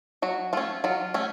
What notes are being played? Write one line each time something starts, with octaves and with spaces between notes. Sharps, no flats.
F#3 F#4
A3 C#4 F4
F#3 F4
A3 C#4